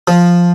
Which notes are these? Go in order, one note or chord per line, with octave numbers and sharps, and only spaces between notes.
F3